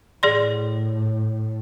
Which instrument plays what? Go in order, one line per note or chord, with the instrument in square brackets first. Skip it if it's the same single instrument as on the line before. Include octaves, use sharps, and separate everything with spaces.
[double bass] A2 [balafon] G#4 D5 C6